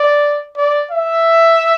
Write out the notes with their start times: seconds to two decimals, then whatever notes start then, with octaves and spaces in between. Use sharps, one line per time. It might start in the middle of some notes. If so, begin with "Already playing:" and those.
Already playing: D5
0.57 D5
0.91 E5